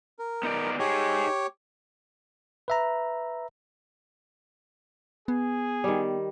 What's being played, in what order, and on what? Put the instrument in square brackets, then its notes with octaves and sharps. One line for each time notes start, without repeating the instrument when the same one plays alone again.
[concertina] A#4
[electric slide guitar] B3 D#4 D5
[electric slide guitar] D#4 G#4 [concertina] G4 C#5
[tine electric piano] B4 E5 A#5
[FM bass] B3 [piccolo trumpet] G#4
[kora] D#3 G3